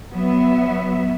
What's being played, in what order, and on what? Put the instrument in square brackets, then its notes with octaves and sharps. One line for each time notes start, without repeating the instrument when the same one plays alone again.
[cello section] F#3 B3 E5